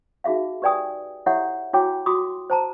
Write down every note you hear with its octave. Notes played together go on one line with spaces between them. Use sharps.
D#4 F#4 G#4 E5 F5
G4 B4 D5 G5 G#5 D#6
E4 G4 A4 C#5 E5 F#5
E4 F#4 C#5 G5 G#5 D6
F4 F#4 C6 D6 D#6
C5 A5 A#5